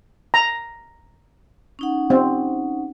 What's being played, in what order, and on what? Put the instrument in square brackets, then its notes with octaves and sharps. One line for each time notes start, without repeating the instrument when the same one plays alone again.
[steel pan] A#5
[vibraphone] C#4 D#4 F#5
[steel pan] C4